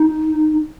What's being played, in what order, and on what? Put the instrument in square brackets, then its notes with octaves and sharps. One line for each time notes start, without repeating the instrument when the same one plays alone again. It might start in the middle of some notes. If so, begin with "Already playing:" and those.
Already playing: [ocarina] D#4